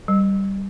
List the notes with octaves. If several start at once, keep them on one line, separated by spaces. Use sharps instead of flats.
G3